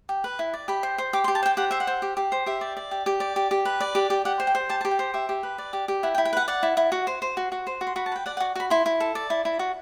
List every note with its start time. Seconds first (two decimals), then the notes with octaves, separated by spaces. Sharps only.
0.09 G4
0.24 B4
0.39 E4
0.53 D5
0.68 G4 B5
0.83 C5
0.98 C5
1.13 G4 D6
1.24 C6
1.28 G4
1.35 A5
1.43 C5 G5
1.57 G4 F#5
1.71 C5 E5
1.80 F#5
1.87 C5
2.02 G4
2.17 G4
2.32 C5
2.46 G4 E5
2.61 D5
2.77 D5
2.91 G4
3.06 G4
3.20 D5
3.36 G4
3.51 G4
3.65 B4
3.81 D5
3.95 G4
4.10 G4
4.25 G4 F#5
4.40 C5
4.47 G5
4.55 C5
4.69 G4 A5
4.81 A5
4.85 G4
4.91 G5
4.99 C5
5.14 G4 E5
5.29 G4
5.43 B4
5.58 D5
5.73 G4
5.88 G4
6.03 E4 F#5
6.15 G5
6.18 E4
6.25 G5
6.33 B4 F#5
6.48 D5 F#5
6.63 E4
6.77 E4
6.92 F#4
7.07 C5
7.22 C5
7.37 F#4
7.52 F#4
7.67 C5
7.81 F#4
7.87 C6
7.96 F#4 B5
8.06 A5
8.12 B4 G5
8.26 D5 F#5
8.37 F#5
8.40 F#4
8.55 F#4 B5
8.70 E4 C6
8.86 E4
9.00 A4
9.15 D5
9.30 E4
9.45 E4
9.59 F#4